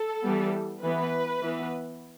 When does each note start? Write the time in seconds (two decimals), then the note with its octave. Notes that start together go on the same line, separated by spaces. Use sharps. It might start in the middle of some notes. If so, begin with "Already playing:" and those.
Already playing: A4
0.23 E3 G3 B3
0.83 E3 B3 B4
1.42 E3 B3